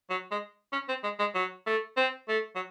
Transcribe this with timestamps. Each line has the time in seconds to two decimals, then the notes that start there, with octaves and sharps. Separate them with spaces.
0.10 F#3
0.31 G#3
0.72 C#4
0.88 C4
1.03 G#3
1.19 G#3
1.35 F#3
1.66 A3
1.97 C4
2.29 A3
2.55 F#3